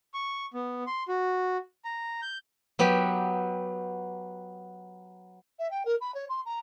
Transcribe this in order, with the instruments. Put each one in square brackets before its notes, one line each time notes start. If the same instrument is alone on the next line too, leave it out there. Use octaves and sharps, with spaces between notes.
[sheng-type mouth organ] C#6
B3
C6
F#4
A#5
G6
[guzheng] F#3 B3 G4
[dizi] E5
G5
A#4
B5
C#5
C6
A#5